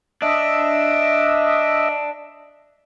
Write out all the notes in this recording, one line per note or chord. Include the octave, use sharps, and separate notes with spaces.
D4 D#5 E5